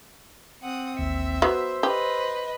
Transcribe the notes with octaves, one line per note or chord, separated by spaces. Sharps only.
C4 F#5 D#6
A1 D#2 E5 C#7
F#3 B3 C5 E6
G4 B4 D#5